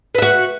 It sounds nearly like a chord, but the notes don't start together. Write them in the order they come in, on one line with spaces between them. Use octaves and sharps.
B4 E5 F#4